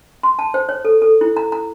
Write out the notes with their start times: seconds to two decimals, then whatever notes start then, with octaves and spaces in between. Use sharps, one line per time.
0.23 C6
0.39 A5
0.54 C5
0.69 C#5
0.85 A4
1.02 A4
1.21 E4
1.37 A#5
1.52 A#5